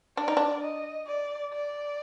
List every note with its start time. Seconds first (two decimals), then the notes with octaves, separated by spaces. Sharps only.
0.17 D4 D5
0.28 D#4
0.37 D4
0.62 D#5
1.07 D5
1.53 D5